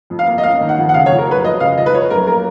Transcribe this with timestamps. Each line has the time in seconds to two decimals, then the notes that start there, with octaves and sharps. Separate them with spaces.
0.10 F2
0.19 F5
0.27 A#3
0.38 D#5
0.43 C#4 F5
0.61 D#3
0.69 F#5
0.77 F2
0.89 F#5
0.94 C#3 F5
1.06 C#5
1.11 F2
1.19 A#4
1.27 F#3 B4
1.43 F2 D#5
1.60 C#3 F5
1.77 F2 D#5
1.86 B4
1.94 F3 C#5
2.10 F#2 A#4
2.27 A#3 A#4